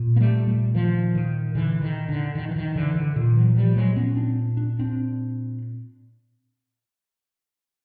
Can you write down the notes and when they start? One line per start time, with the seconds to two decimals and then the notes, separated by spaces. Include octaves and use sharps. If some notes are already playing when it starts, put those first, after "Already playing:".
Already playing: A#2
0.16 A#3
0.20 G3 A3
0.47 G3 A3
0.74 D#3 F3
1.15 D#3
1.55 D3 E3
1.82 D#3
2.09 D3
2.35 D#3
2.49 E3
2.56 D#3
2.76 D3 E3
2.96 D3
3.16 A#2 D#3
3.36 E3 F#3
3.56 F3 G3
3.76 F#3 G#3
3.96 B3 C#4
4.16 C4 D4
4.57 D4
4.79 C4 D4